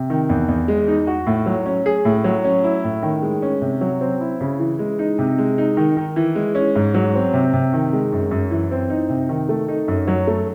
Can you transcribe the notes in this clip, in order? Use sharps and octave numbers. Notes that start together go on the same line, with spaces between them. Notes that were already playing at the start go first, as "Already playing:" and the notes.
Already playing: C3
D#3
E2
E2
G#3
D#4
F#4
A2
F#3
C#4
G#4
A2
F#3
C#4
E4
A2
D#3
G#3
C#4
C3
F#3
C4
E4
C#3
E3
G#3
D#4
C3
G#3
D#4
D#3
D#3
E3
G#3
C#4
G#2
F#3
C4
C3
C3
D#3
G#3
F#2
F#2
E3
C4
D#4
C3
D#3
A3
D#4
F#2
F#3
A3